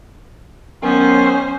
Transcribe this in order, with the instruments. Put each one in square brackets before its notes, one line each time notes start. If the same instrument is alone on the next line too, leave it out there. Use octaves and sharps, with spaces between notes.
[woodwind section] D#3 F#3 B3 [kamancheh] C#4 C5